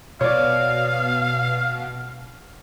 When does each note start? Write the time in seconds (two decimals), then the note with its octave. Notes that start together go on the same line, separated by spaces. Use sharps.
0.21 B2 C#5 D5 F5